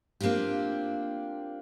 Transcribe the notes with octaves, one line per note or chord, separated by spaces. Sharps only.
A#3 C4 D4 F4 G4